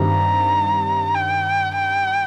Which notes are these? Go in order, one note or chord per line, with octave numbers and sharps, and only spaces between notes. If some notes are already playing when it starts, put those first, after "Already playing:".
Already playing: G2 D#3 G3 C4 A#5
G5
G5